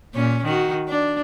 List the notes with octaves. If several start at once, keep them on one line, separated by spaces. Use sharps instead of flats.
A#2 C#4
D#3 F#4
D4